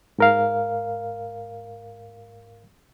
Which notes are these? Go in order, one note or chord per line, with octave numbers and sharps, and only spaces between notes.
G#2 A#4 F5